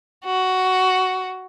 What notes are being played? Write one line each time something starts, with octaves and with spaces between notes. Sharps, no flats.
F#4